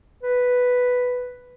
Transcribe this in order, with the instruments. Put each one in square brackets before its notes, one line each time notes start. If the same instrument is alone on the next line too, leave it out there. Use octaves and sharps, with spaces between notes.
[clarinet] B4